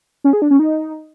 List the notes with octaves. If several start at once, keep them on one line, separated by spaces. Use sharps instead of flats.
C#4
G#4
D4
C#4
D#4